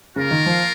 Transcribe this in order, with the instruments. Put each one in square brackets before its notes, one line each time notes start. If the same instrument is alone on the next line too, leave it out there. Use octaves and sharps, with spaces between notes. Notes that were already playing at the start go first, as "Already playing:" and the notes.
[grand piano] C#3 [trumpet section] A#3 F4 A#4
[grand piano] D#3
F3